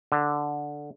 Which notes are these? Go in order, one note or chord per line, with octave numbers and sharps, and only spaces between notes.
D3